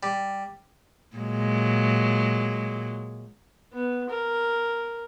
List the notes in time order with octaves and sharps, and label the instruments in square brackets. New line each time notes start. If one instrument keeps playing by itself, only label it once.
[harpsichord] G3
[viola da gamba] A#2 F#3 G#3
[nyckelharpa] B3
A#4